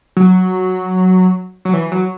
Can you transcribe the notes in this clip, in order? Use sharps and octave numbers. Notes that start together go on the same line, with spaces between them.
F#3
F#3
E3
F#3